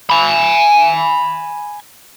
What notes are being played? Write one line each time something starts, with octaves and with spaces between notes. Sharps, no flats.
G#5 B5